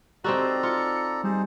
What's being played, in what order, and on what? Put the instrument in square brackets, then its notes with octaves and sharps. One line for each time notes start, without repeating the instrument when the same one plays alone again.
[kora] C4 D#4 F#4 [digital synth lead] G4 [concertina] A4 D5 A#5
[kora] F4 [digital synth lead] C#7
[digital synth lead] G3 [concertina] D#4 G#4 C5